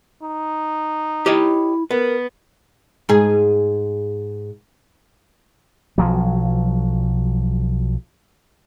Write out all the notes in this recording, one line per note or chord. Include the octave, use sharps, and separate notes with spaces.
D#4
E4 G4 C#5 D#5
B3 A#4
G#2 G#4
B1 F3 F#3